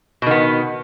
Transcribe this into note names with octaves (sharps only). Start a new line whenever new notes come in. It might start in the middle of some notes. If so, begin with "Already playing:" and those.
B2 D#3 B3